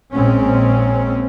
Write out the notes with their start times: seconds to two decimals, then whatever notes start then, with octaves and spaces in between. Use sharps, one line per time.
0.12 A#1 A#2 G#3 C4 C#4